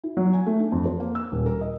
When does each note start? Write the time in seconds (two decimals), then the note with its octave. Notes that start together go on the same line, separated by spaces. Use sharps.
0.04 E4
0.17 F#3
0.33 G#5
0.47 A3
0.59 D4
0.72 F2
0.86 C5
1.00 A#3
1.15 E6
1.32 D#1
1.46 A#4
1.61 D#5